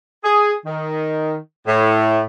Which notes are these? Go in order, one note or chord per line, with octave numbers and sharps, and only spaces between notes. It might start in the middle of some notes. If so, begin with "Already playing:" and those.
G#4
D#3
A2